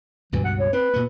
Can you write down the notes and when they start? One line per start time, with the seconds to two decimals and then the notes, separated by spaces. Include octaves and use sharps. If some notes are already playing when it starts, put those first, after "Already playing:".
0.32 C#2 G2 B2 E3
0.45 F#5
0.59 C#5
0.73 C4 B4
0.94 A#2 B3